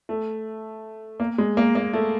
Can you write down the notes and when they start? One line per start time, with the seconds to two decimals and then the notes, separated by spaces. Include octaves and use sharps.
0.09 A3
1.20 A#3
1.38 G#3
1.57 A#3
1.75 A#3
1.93 A3